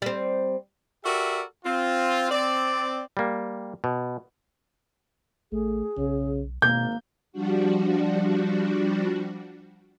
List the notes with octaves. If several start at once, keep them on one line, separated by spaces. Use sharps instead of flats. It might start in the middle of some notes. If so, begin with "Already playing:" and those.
G3 C4
F#4 G4 A4 A#4 D5 E5
C4 F4
C4 D5
G3 A#3
B2
A1 A3 G#4
B1 C#3
G#1 B2 A#3 G6
F3 G3 D4 F#4